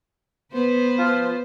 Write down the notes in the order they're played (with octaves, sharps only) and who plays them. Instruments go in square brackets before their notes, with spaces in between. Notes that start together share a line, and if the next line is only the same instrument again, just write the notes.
[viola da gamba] B3 B4 C5
[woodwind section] F3 F4